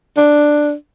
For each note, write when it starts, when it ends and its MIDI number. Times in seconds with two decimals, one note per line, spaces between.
0.17 0.73 62